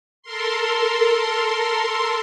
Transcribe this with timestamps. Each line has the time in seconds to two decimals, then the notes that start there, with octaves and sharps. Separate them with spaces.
0.22 A4 A#4 C6